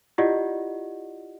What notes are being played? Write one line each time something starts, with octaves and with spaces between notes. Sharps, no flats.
E4 F4 G4 D5 D#5 F#5